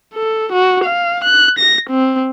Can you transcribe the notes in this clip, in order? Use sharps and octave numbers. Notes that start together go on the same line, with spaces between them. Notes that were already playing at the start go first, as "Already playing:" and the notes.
A4
F#4
F5
F#6
A#6
C4